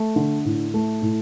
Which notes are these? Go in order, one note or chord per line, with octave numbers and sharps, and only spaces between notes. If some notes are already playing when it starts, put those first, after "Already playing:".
Already playing: A3
D3
A2
A3
A2